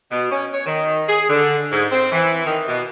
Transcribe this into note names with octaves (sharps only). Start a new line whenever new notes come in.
B2
C#4
C#5
D#3
G#4
D3
G#2
C4
E3
D#3
B2